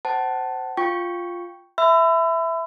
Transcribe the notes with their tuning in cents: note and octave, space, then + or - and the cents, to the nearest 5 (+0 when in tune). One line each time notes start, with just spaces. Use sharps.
C5 -5 F#5 +35 A5 +0
F4 +0 G5 +0 C#6 +0
E5 +0 B5 +35 E6 +25